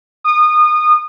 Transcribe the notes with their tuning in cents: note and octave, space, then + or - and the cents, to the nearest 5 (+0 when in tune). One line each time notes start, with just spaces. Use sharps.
D#6 -25